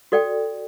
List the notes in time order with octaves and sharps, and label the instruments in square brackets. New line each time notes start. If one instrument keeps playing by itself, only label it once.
[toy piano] F#4 A4 D5 G5